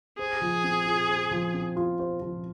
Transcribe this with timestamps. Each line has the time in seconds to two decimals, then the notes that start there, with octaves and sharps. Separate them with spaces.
0.19 G#4 C5
0.41 F3
0.64 C4
0.86 F4
1.10 C5
1.31 F3
1.54 C4
1.76 F4
1.99 C5
2.22 F3